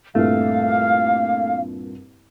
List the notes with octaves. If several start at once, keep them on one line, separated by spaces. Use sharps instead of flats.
C2 G2 A#2 A3 F5